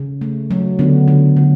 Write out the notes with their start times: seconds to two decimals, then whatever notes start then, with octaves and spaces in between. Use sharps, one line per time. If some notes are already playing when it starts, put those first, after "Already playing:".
Already playing: C#3
0.21 A3
0.51 F#3
0.79 D3 B3
1.08 D3
1.37 D3